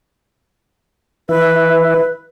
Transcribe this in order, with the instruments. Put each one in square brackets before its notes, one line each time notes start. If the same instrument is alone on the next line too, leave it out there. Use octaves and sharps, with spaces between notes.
[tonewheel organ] E3 E5 [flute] B4